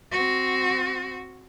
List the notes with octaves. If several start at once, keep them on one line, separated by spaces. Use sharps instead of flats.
C4 F#4